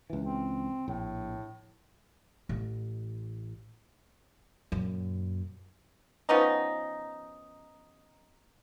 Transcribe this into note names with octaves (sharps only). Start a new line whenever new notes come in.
C#2 E3
C4
A#1 A2
A1
F#2 A#2
F3 B3 C#4 D#4